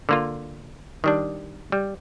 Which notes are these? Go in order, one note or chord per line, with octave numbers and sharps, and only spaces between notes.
D3 A#3 F4
D#3 G3 D4
G3